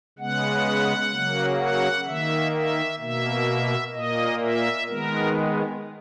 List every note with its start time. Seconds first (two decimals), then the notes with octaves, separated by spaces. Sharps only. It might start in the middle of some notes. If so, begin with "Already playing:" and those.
0.19 C#3 G#3 B3 F#5
1.12 C#3 F#3 A#3
1.59 F#5
2.06 D#3 A#3 E5
2.53 E5
2.99 B2 A#3 E5
3.93 A#2 A#3 D#5
4.41 E5
4.87 D#3 G#3 B3 A#4